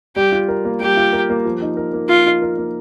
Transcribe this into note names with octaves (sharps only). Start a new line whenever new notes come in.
G3 G4
F4
A#4
A#3
G3 G4
F4
A#4
A#3
F3
D#4
A#4
A#3
F3 F4
D#4
A#4
A#3